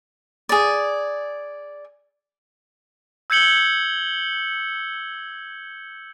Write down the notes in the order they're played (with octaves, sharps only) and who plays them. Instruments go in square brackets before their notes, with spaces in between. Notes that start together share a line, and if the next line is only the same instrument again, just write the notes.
[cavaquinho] G#4 D5
[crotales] E6 G6 G#6 C#7 F#7 G7